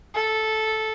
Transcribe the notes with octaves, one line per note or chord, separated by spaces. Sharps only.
A4